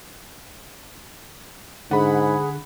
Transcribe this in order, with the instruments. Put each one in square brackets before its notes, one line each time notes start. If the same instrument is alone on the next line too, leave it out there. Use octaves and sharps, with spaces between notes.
[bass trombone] G#2 [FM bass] D3 [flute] G#4 [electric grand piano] F#5 B5